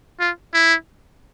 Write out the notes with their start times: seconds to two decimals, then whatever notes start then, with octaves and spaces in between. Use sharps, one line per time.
0.20 F4
0.54 E4